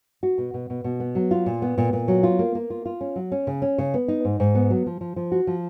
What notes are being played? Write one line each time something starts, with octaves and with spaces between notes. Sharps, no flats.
F#4
B2
B2
B2
B2
B3
F#3
F4
A#2
B3
A#2
A#2
F#3
F4
A#3
A#3
F4
F4
C#4
F#3
C#4
C#3
C#4
C#3
B3
D#4
G#2
G#2
B3
F#3
F3
F3
F3
F#4
F3